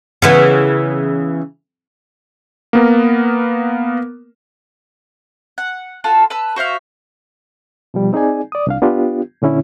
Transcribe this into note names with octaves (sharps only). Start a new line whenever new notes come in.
C#3 E3 B3
A#3 B3 A#4
F#5
F4 F#4 A4 A5
B4 A5 B5 E6
F#4 C5 E5 F5
B2 F3 G3
C4 D#4 G#4 D5 G#5
D5 D#6
C2 D4 F5
B3 D4 F4 G4
A#2 D3 C#4 E4